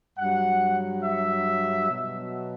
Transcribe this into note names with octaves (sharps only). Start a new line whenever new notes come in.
G2 F#3 F#5
E5
B2 F#3